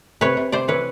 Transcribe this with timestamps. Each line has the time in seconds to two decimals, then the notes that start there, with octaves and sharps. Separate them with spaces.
0.21 C3 B4 C#5
0.37 C3
0.52 C3 C5 D5
0.68 E3 B4 C#5